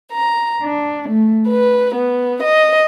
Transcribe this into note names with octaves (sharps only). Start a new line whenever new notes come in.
A#5
D4
A3
B4
B3
D#5